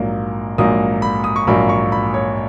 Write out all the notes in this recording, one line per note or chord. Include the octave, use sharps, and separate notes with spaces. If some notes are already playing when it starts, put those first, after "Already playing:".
Already playing: A#1 G#2 F#3 A#3
A#1 G#2 F#3 A#3 D#6
B5
D#6
C#6
A#1 G#2 F#3 A#3 B5
C#6
B5
C#5